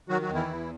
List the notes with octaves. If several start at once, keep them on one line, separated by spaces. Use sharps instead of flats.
D#3 F#3 F#4
F#3 F#4
E2
E3 E4
E2